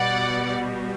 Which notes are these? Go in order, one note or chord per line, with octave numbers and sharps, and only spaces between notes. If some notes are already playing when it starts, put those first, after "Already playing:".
Already playing: B2 G3 D5 F#5